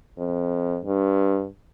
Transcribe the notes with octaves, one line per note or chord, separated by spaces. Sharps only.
F2
G2